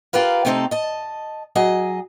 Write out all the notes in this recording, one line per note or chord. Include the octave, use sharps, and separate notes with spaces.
F4 G4 A#4 B4 F5
C3 A3 B3 C4 D#4 A4
D#5 A5
F#3 G#4 D#5